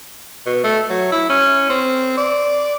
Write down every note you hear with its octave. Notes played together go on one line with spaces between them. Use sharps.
B2
A3
F#3
E4
C#4
C4
D5